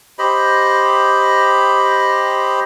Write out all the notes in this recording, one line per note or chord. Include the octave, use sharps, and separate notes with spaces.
G4 C5 D#5 B5